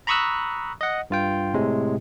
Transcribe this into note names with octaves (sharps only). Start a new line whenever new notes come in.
A#5 B5 C#6 D#6 E6 F#6
D#5 F#5
G2 F4 G5
A2 C3 G#3